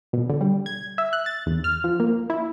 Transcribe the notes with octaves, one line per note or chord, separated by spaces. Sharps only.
B2
D3
G3
G#6
E5
F#6
A6
E2
F6
F3
A#3
E4